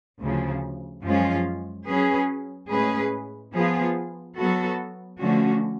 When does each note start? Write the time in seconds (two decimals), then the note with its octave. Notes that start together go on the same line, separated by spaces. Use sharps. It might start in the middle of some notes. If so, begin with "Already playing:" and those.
0.21 D2 C#3 F3
1.04 F#2 F3 G#3 C#4 F4
1.88 F#3 C#4 G#4 B4
2.70 A2 G#3 C#4 G#4 B4
3.53 F3 B3 F4 G#4
4.37 F#3 B3 F#4 A4
5.20 D3 F3 A3 C#4 F#4